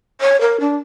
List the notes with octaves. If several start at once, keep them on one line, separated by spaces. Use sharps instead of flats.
C#5
A#4
D4